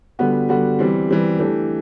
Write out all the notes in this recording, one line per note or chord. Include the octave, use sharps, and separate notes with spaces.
D3 G3 B3 F#4
D3 G3 B3 F#4
E3 G3 C4
E3 G3 C4
E3 A3 D4 G4